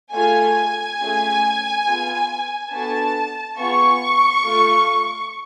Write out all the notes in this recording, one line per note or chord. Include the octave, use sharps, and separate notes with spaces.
A3 F4 G#4 G#5
A3 C#4 F4 G#4
B3 F4 G#4
B3 D4 F#4 A4 A5
B3 F4 G#4 C#6
A3 F4 A4